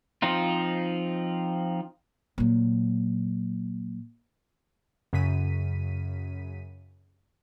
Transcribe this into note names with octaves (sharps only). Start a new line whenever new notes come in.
F3 C4 D#4 F4
A#2 F#3
F#2 C#3 B6 D#7